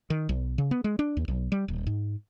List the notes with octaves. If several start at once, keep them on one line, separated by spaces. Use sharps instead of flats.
D#3
B1
C#3
B3
G#3
D4
D#2
B1
G3
D#1
G#2